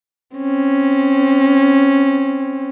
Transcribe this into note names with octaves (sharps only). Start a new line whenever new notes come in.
C4 C#4